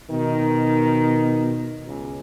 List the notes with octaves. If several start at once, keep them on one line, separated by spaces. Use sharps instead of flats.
B2 D#3
C#2